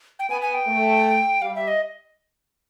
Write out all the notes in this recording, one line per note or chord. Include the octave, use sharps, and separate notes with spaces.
G5
B3 G#5
G#5
G5
A3
G3 F5
E5
D#5